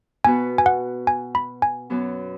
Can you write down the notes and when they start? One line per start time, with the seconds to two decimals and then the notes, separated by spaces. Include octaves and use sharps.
0.24 B2 B3 F#4 B4 G#5
0.58 G#5
0.66 F#5
1.07 G#5
1.35 B5
1.62 G#5
1.90 F#2 F#3 B3